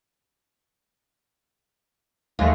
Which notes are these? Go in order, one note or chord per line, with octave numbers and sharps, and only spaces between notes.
D#2 G#3 A3 F4